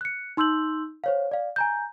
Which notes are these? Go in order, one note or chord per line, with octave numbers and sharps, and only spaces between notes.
F#6 C#7
D#4 C6 E6 G6 F#7
C5 C#5 F5
D5 F5
G#5 A#5 G6